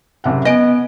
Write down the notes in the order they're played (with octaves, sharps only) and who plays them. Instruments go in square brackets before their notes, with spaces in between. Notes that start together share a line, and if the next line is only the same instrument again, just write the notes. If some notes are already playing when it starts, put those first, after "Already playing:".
[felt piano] F#1 C3 F#5
[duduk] B3 [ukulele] D#5 [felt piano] G#5 D7